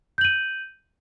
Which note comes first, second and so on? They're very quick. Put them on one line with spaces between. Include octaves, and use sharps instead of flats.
G6 F#7 D#7